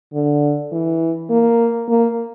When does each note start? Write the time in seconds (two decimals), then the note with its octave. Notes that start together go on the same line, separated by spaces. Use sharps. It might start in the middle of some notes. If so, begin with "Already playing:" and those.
0.14 D3
0.72 E3
1.30 A#3
1.89 A#3